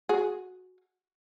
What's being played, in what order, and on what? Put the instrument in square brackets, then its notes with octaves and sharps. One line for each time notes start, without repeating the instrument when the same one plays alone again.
[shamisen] F#4 G#4